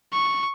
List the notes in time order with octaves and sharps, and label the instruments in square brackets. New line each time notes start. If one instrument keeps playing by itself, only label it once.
[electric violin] C#6